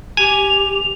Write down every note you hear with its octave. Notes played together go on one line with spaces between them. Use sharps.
G4 G#5 F7